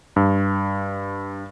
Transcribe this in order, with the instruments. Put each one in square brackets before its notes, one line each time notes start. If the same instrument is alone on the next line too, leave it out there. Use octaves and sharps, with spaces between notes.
[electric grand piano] G2